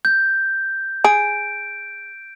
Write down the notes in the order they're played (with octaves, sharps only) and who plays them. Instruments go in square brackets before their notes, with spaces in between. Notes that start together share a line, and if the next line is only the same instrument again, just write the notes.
[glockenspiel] G6
[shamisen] G#4 [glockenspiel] D7